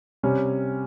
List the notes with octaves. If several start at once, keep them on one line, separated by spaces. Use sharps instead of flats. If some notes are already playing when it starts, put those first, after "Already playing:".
C3 G3 C#4